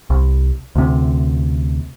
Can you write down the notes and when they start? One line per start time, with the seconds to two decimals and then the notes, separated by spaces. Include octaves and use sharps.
0.10 C2
0.76 D2 C3